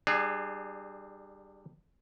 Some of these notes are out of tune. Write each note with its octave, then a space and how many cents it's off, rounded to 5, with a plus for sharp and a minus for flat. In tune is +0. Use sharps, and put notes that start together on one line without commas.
G3 +0 D4 +35 G#4 +0